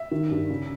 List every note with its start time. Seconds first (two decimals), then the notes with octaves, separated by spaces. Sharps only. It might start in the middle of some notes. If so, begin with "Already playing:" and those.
Already playing: E5
0.11 D#3
0.31 G2
0.50 C#3